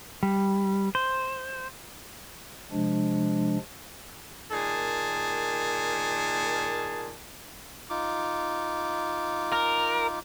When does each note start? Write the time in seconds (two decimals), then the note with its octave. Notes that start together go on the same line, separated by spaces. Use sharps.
0.23 G3
0.95 C5
2.72 C3 F3 G#3 D4
4.50 A#2 D#3 G#4 A5
7.90 D#4 F4 D6
9.52 A#4